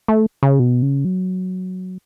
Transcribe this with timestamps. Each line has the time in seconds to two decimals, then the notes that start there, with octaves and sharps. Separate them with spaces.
0.08 A3
0.43 C#3
0.59 B2
0.82 C#3
1.05 F#3